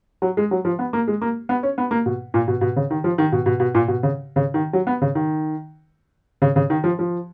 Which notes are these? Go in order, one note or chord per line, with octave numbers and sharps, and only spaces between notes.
F#3
G#3
F#3
F3
B3
A#3
G#3
A#3
B3
C#4
B3
A#3
B2
A#2
B2
B2
C#3
D#3
F3
D#3
B2
B2
B2
A#2
B2
C#3
C#3
D#3
F#3
B3
C#3
D#3
C#3
C#3
D#3
F3
F3